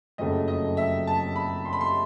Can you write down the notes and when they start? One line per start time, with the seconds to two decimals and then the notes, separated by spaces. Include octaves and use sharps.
0.18 F#1 F2 C#3 F#3 A3 D#5
0.48 D#5
0.77 E5
1.07 A5
1.36 B5
1.65 C6
1.73 B5
1.81 C6